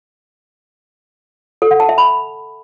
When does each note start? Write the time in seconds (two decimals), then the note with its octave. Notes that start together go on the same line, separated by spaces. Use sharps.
1.62 A4
1.71 F#5
1.80 A5
1.89 E5
1.98 B5